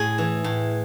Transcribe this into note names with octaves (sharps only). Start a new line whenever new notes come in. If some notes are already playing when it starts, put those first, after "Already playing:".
Already playing: A2 G#4
E3
A2